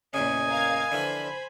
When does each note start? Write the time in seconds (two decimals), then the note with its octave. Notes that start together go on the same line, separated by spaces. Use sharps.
0.14 E2 A#2 C#3 D#5 G#5
0.46 A#4 F5 G#6
0.92 D3 E3 F3 C5 B5